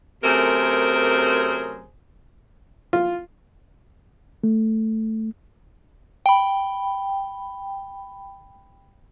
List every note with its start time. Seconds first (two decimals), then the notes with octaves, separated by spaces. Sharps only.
0.23 F#2 C3 A3 G#4 A#4 C5
2.93 F4
4.44 A3
6.26 G5 B5